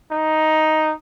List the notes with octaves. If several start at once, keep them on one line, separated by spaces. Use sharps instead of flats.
D#4